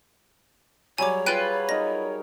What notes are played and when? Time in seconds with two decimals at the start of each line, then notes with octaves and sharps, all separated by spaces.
0.98 F#3 G3 G#4 C#5 G#5 D6
1.26 F4 B4 G5 F#6 D#7
1.69 D#4 A#4 D#5 A#6